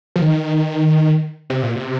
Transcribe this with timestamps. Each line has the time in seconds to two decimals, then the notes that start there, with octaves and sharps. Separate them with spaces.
0.16 F3
0.21 D#3
1.50 C3
1.63 A#2
1.76 C3